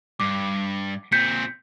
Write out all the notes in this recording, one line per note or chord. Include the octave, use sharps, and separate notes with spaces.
G2 D6
A#2 C4 G6 B6 C#7